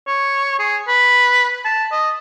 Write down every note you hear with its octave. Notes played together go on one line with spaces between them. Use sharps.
C#5
G#4
B4
A5
D#5